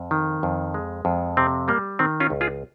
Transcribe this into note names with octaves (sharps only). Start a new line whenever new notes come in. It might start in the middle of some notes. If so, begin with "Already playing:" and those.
Already playing: F2
D#3
F2
G#3
F2
C3 C4
G3 A#3
D#3 C4
C#4 F4
C#2
F4 G#4